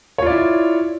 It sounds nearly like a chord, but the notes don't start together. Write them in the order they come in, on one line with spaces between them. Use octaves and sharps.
C#5 F4 D5 E4